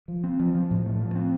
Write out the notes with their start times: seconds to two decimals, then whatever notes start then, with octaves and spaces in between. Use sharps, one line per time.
0.08 F3
0.24 C4
0.40 F3
0.55 F3
0.70 A2
0.86 A3
1.00 F3
1.16 C4